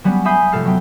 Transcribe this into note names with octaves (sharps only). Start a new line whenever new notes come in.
F#3 G3 B3 C#4 C#5
E5 G#5 B5 D#6 G6 C7
F1 C3 A3 A4 F6 C7
F#3 B3 G5